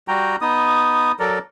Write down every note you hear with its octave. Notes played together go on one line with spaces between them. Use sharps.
G3 F#4 G5 A#5
B3 D#4 D#6
F#3 A4 A#4 D5